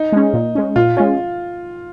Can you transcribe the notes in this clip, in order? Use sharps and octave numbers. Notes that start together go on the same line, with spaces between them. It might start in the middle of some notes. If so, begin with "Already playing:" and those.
Already playing: D#4
G#3 C#4
A#2
G#3 C#4
A#2 F4
G#3 C#4 F4